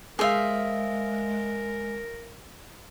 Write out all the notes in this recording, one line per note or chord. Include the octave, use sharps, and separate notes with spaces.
G#3 G#4 A#4 C5 E5 F5